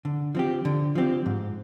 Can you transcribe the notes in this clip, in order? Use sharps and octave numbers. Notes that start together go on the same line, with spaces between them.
D3
F3 C4 G4
D3
F3 C4 G4
G#2